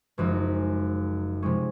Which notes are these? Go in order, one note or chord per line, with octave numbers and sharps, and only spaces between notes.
F#1 F#2 F3 G#3 D#4
C3 F3 G#3 C#4